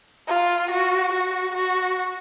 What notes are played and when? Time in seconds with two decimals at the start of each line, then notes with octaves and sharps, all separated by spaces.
0.28 F4
0.71 F#4
1.12 F#4
1.55 F#4